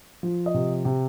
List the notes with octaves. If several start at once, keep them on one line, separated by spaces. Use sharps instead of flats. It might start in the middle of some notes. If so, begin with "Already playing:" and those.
F3
D#5
C3
C3